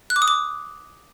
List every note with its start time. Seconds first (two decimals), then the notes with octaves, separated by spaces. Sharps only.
0.10 F#6
0.16 D6
0.22 D#6
0.28 D6